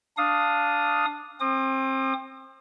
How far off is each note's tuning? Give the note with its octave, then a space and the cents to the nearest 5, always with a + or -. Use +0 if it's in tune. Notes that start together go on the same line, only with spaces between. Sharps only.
D4 +0 F5 +0 D#6 +0
C4 +25 D#6 -35